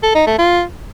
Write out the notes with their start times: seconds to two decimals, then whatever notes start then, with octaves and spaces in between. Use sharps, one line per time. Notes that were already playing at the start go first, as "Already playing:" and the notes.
0.03 A4
0.15 D#4
0.27 A3
0.38 F4